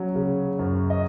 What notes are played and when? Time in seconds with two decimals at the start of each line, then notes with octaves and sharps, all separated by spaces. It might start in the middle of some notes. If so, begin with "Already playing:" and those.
Already playing: F#3 C#4
0.15 C#3
0.59 F#2
0.90 D#5